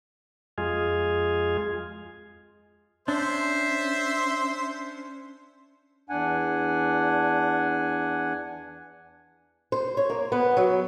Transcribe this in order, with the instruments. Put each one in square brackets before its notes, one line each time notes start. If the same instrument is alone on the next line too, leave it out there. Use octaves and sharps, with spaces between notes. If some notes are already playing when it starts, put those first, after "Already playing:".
[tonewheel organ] F2 G#3 F4 G#4
[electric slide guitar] C#4 D4 [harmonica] C5 E5 C6
[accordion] E2 D4 F#5 G#5
[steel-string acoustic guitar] C5
C#5
A#3
B3
F#3